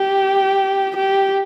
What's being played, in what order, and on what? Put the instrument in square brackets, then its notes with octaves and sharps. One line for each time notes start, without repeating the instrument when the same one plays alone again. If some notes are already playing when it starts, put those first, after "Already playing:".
Already playing: [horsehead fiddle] G4
G4